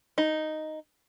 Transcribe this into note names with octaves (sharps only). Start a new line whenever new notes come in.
D#4